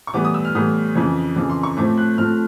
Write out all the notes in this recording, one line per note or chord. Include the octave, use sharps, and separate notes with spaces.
C#6
A2 E3 G3 B3 D6
D#6
E6
F6
A2 E3 G3 B3 D#6
F2 C#3 E3
F2 C#3 E3 D6
C6
C#6
A2 F3 A3 C4 D6
F#6
A2 F3 A3 C4 F6